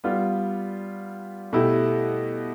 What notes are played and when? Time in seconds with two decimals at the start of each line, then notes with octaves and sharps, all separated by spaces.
0.04 G3 B3 F4
1.53 B2 A3 E4 G4